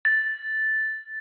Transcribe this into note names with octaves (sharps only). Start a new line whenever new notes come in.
A6